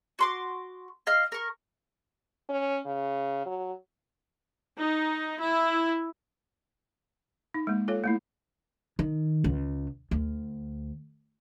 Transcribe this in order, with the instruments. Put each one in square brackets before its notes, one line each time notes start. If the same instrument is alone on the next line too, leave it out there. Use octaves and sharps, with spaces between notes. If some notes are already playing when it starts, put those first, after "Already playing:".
[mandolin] F#4 C6 D6
D#5 F5 F6
A#4 C#6
[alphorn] C#4
C#3
F#3
[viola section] D#4
E4
[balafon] D#4
G#3 A#3
F4 A4 C#5 F5
A3 A#3 E4
[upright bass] D#3
C#2
D2